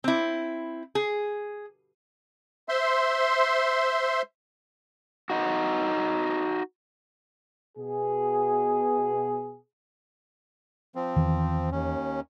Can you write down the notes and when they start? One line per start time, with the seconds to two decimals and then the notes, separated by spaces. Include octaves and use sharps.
0.04 C4 E4
0.95 G#4
2.69 C5 E5 C6
5.30 D#4 F#4
7.78 B2 G#4
10.95 F3 C4
11.16 E2 D#3 E3
11.72 D#2 C#4